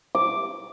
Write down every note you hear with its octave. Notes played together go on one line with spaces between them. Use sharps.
D6